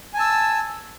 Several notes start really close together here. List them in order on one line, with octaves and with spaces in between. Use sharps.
G#5 A5 E6